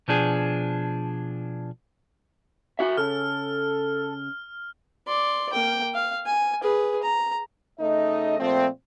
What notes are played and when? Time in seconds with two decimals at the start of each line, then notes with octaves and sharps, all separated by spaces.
0.08 B2 F3 D4 G#4
2.79 F#4 E5
2.97 C#3 A4 F6
5.07 D5 C6
5.53 A#3 G5
5.94 F5
6.26 G#5
6.63 G#4 B4
7.03 A#5
7.80 C#3 A3 D#4 D#5
8.40 A#2 F3 A3 C4